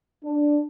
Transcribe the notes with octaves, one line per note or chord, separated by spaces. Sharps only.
D4